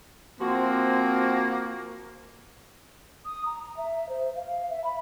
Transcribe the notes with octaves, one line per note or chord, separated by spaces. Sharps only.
F3 A#3 C4 F#4
D#6
A#5
A#5
E5
C5
F5
E5
B5